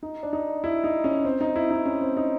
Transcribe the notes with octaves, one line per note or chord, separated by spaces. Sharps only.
D#4
D4
D#4
E4
D#4
C#4
C4
D#4
E4
D#4
C#4
C4
D#4